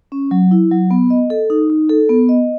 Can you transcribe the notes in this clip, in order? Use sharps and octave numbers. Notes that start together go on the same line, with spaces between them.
C#4
F#3
E4
F#3
B3
D#5
A4
D#4
D#4
A4
B3
D#5